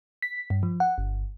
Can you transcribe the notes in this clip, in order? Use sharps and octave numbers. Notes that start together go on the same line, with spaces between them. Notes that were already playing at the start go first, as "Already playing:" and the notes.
B6
G2
F3
F#5
G1